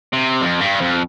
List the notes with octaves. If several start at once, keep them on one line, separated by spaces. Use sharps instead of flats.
C3
F2
G2
F2